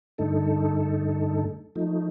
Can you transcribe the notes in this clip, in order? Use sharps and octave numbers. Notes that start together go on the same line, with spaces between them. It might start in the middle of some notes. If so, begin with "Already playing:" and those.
G2 D3 A3 D#4 A4
F3 A3 D#4